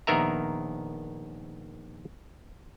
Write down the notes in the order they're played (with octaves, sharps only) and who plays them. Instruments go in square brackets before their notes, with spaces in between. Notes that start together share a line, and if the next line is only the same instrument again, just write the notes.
[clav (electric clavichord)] A#1 D#3 B3 A#4 E5 A#5